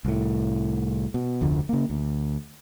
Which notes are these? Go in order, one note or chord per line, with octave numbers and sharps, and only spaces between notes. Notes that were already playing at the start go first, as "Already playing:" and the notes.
C2 A2
B2
F1 D2 D3 F3
C#3 A#3
D2